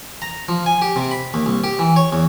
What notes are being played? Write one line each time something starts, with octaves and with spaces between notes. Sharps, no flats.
A#5
F3
G#5
G4
C3
B5
D#2
C2
G4
E3
C#5
E2